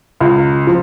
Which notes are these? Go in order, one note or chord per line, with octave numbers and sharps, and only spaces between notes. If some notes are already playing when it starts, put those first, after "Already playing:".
C#2
F3